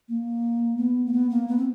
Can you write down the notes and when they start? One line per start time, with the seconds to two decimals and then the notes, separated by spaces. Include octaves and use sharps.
0.09 A#3
0.78 B3
1.06 A#3
1.13 B3
1.30 A#3
1.48 B3
1.58 C4